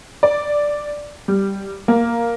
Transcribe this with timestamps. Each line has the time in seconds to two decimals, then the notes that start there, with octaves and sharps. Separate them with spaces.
0.23 D5
1.28 G3
1.88 A#3